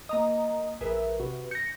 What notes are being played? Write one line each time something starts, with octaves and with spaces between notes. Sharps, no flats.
A#3 D#5 A#5 D#6
A#1 G#4 A#4 B4 E5
C3 F#4 B4
G6 A#6 C#7